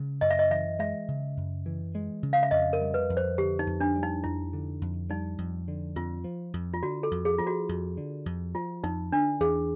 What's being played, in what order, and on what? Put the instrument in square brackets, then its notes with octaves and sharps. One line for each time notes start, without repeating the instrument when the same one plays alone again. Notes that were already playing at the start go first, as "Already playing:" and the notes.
Already playing: [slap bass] C#3 G#3
[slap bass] F#2 [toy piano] D#5
[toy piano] E5
D#5
[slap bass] E3 [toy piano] E5
[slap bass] G#3 [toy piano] E5
[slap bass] C#3
F#2
E3
G#3
C#3
[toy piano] F5
E5
[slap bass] F2 [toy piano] D#5
[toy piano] A#4
[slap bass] G3
[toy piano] B4
[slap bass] F2
[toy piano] C5
[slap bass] D3 [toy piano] G4
[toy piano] D#4
[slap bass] F2
[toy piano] D4
[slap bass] G3
[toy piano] D#4
[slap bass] F2 [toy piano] E4
[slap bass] D3
F2
[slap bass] G3 [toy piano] D#4
[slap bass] F2
D3
[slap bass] F2 [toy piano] F4
[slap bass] F3
F2
[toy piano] F4
[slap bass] D3 [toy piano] F#4
[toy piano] A4
[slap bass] F2
[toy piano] G#4
[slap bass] F3 [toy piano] F4
[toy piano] F#4
[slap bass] F2
D3
F2
[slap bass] F3 [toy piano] F4
[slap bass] F2 [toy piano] D#4
[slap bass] D3 [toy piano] D4
[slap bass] E2 [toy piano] G#4